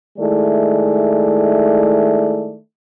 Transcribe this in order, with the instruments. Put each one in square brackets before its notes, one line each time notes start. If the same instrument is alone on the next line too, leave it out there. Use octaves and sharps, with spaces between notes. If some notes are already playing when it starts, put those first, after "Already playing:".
[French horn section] D#3 G#3 A3 E4 D5